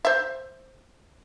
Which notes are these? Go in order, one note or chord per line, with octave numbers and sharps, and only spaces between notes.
C5 E5